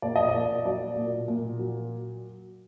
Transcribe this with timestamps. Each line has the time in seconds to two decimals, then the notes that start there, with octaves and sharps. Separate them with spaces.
0.02 A#2 D5
0.16 D#5
0.29 D5
0.34 A#2
0.65 F#3 D5
0.96 A#2
1.28 A#2
1.59 F#3